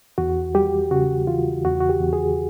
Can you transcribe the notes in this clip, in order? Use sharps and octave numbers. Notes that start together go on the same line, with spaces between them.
E2 F#4
G3 G4
C#3 F#4
E3 F4
E2 F#4
F#4
G4
E2
G#4